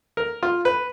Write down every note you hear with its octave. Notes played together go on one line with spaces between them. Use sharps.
A#4
F4
B4